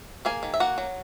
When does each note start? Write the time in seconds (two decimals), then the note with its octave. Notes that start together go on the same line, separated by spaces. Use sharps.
0.25 A#3 G#4 G#5
0.43 D#3
0.54 E5
0.60 A#3 F#4 F#5
0.78 F#3